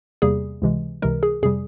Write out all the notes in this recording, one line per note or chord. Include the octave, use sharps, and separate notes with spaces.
E2 C3 G3 A#3 G#4
C#2 C3 E3 G#3
C#2 C3 E3 G#3 A#4
G#4
F2 C3 G3 G#4